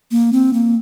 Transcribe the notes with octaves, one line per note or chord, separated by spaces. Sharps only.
A#3
C4
A#3